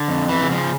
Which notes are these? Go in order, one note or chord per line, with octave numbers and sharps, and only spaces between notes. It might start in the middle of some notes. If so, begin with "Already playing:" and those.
Already playing: D3
F2
E3
C#3
F3